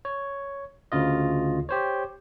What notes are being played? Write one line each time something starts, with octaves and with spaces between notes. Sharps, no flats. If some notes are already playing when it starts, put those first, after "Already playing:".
C#5
D2 C#3 F4 D#5
G4 C5 C#5